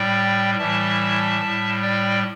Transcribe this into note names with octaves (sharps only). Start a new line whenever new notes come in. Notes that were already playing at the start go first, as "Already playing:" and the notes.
Already playing: A2 G3 D5 G5
A2 E3 G3 E5 A5
A2 G3
D5 G5